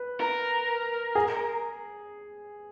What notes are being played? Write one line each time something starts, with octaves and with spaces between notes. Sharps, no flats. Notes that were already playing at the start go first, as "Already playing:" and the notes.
Already playing: B4
A#4
G#4